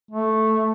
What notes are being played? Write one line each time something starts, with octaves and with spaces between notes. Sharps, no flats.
A3